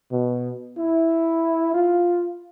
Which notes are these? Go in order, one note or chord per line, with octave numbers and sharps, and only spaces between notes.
B2
E4
F4